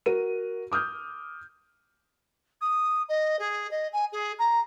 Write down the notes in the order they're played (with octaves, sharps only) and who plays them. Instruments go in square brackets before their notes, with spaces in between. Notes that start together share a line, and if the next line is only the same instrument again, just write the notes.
[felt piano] F#4 A#4 D#7
D6 D#6 F6 G6
[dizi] D#6
D#5
G#4
D#5
G#5
G#4
A#5